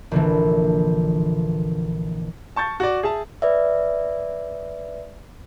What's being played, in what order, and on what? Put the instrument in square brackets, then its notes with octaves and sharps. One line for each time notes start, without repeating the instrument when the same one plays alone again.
[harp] A#1 D3 E3
[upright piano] A5 C#6 G6 A6
F#4 D5
G#4 E5 A5
[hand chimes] B4 D5 E5